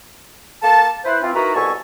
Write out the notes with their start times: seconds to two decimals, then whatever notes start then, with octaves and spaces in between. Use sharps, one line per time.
0.62 A#3 A4 F5 A5
1.04 E4 B4 C5
1.21 E3 C4 F4
1.34 D#4 E4 F#4 A#4 B4 A#5
1.54 C2 B2 A4 G#5 A5 C#6